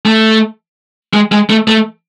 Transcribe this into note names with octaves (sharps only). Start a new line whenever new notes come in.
A3
G#3
G#3
A3
A3